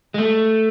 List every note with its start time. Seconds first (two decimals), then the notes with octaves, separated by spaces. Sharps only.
0.14 G#3
0.18 A3